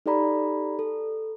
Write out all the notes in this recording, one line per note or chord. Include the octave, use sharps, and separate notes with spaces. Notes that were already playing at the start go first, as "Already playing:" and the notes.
D#4 G4 A4 D5 A#5 B5
A4